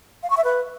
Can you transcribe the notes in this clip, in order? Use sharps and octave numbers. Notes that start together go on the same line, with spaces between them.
F5
C#6
E5
B4